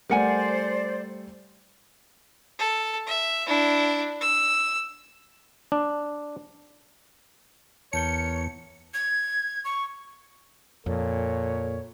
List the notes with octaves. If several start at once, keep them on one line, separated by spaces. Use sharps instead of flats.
G3 A3 A#4 C5 D5 F#5 G#5 C#7
A4
E5
D4 E4
E6
D4
E2 A#4 C#5 A5 G6 C#7 G7
G#6
C#6
F2 A#2 A4 C#5